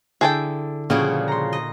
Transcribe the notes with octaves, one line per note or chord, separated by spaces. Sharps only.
D3 E4 G#4 A4 G5
A#2 C#3 F3 G3 F#4 G#4
A#5 C6
D#5